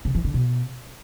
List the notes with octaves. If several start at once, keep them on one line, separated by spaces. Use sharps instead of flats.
C#3
E3
D3
B2